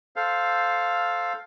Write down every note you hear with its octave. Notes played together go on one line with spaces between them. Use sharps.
A4 C5 F5